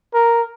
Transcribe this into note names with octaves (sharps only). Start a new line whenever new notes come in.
A#4